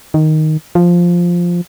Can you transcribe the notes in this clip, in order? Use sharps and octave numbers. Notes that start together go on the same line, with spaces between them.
D#3
F3